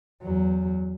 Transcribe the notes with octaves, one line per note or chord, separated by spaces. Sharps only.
E2 F#3